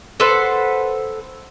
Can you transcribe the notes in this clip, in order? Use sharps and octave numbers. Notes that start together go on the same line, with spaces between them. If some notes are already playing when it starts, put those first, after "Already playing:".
A4 B4 C5 F#5